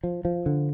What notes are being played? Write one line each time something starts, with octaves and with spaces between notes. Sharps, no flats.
F3
F3
D3